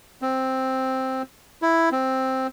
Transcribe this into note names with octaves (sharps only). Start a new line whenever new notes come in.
C4
E4
C4